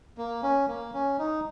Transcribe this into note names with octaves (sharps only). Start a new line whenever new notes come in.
A#3
C#4
A#3
C#4
D#4